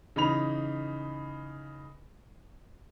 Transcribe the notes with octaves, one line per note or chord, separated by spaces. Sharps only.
C#3 E3 D#4 B5 F7